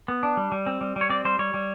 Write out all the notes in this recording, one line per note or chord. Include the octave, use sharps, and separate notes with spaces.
B3
D4
G3
G3
C4
G3
G3
C#5
C4 D5
G3 C5
G3 C#5
G3